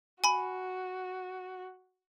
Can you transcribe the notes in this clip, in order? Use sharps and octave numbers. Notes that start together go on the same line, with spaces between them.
F#4 G#5 B5